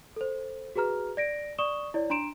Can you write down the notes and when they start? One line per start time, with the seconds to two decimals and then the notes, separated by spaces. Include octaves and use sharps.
0.16 A4 C5
0.75 F#4 G#4 B4 A#5 F6
1.17 D5 A#6 D7
1.58 D5 C#6 D#6 E7 G7
1.94 E4 C#5 D5
2.10 D4 A#5 C6 D7 E7